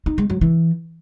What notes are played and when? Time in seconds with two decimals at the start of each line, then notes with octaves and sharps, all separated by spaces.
0.06 D#4
0.18 G#3
0.30 F#3
0.41 E3